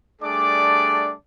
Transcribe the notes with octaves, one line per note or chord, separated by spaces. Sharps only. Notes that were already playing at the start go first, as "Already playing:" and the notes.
G3 A3 D4 G#4 D5 D6